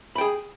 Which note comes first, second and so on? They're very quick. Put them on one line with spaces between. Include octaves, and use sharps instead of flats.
B5 G5 G#4